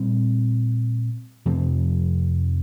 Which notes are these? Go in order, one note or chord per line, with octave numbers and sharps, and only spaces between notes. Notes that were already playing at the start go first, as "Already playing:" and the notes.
Already playing: A#2 G3 C4
F2 C3 F3 C4